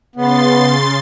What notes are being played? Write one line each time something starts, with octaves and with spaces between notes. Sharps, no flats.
C#3 B3 C6 A6